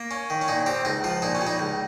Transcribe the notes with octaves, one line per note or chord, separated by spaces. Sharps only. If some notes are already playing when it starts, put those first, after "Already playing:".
Already playing: A#3
C#4
D#3
C#4
A#2 D#4
C4 G4
C#2 D#4
F3 F4
A#2 D#4
C#4
G3
D#4
C#2